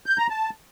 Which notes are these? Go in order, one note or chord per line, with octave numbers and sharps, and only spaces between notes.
G6
A#5
A5